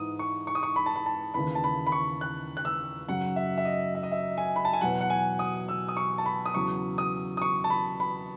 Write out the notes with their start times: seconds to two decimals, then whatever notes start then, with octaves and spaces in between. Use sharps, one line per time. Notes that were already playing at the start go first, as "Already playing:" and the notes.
Already playing: G#2 E3 D#6
0.19 C#6
0.47 C#6
0.55 D#6
0.63 C#6
0.76 B5
0.86 A5
0.96 B5
1.06 A5
1.34 D#2 C#3 E3 B5
1.55 A5
1.64 B5
1.87 B5
1.92 C#6
2.21 F#6
2.57 F#6
2.65 E6
3.08 F#2 C#3 F#3 F#5
3.36 E5
3.57 E5
3.65 D#5
3.95 E5
4.03 D#5
4.12 E5
4.37 G#5
4.56 B5
4.65 A5
4.73 G#5
4.81 E2 B2 F#3 F#5
5.00 F#5
5.10 G#5
5.39 D#6
5.69 E6
5.88 D#6
5.97 C#6
6.18 A5
6.26 B5
6.46 D#6
6.54 E2 C#3 F#3 C#6
6.98 D#6
7.37 D#6
7.42 C#6
7.64 A5
7.70 B5
8.00 B5